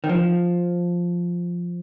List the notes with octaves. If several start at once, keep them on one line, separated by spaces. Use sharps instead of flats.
D#3
F3